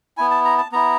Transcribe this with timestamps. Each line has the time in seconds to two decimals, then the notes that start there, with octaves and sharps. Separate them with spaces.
0.17 B3 E4 G#5
0.31 A5
0.45 A#5
0.58 A5
0.72 B3 E4 A#5